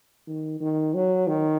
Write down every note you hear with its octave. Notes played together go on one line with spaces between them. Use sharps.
D#3
D#3
F#3
D#3